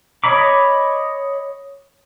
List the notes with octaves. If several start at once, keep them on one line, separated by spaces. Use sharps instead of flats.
C#5 D#5 B5 D6